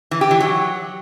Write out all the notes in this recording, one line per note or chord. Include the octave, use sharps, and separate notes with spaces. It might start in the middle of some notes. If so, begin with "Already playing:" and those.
E3
G4
E3
F#3